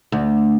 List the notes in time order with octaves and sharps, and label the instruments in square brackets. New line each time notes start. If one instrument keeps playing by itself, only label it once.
[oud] D2